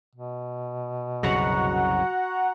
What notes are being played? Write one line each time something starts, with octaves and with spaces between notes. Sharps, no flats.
B2
C2 F#2 C#3 F#4 F#5 A#5